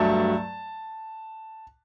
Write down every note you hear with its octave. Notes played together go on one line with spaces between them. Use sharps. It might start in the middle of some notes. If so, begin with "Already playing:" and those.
Already playing: G2 F#3 A3 A5